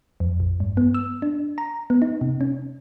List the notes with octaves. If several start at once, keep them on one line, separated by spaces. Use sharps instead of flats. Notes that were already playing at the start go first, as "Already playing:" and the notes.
F2
A#1
G2
B3
E6
D4
A#5
B3
D#4
C3
C#4